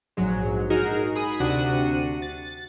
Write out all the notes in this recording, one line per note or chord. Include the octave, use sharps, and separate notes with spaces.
A#1 G#2 F#3 G#3
D#4 F#4 G#4 A#4
G#4 B5 D#6
D2 C3 D4 F#4 F#5 D#7
A6